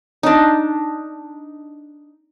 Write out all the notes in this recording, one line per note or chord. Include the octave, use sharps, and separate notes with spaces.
D4 D#4